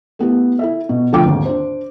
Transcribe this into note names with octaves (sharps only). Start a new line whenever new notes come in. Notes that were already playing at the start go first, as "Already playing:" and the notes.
A3 B3 E4 G4
E4 A4 E5
B2
D3 F3 A3 F4 G5 D6
G#1 D#2
D4 C5